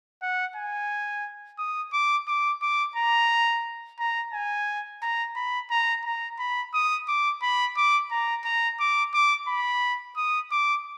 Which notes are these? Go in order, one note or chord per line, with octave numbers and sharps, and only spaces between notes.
F#5
G#5
D#6
D6
D6
D6
A#5
A#5
G#5
A#5
B5
A#5
A#5
B5
D#6
D6
B5
D6
A#5
A#5
D6
D6
B5
D#6
D6